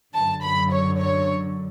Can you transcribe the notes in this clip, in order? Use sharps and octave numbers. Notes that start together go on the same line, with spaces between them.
F#2 D3 A5
B5
C#5
C#5